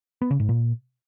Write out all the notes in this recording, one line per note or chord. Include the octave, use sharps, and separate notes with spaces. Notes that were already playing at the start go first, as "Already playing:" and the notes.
B3
C#3
G#2
A#2